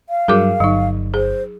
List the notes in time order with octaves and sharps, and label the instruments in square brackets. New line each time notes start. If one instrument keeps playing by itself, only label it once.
[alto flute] F5
[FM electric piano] G2 F#3 [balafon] G#4 A#4 D6
[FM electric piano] G1 [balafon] F#3 D#4
[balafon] G#4 [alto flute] C5